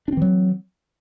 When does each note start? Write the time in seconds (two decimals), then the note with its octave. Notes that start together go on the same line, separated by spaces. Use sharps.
0.08 D4
0.12 C4
0.17 E3
0.22 F#3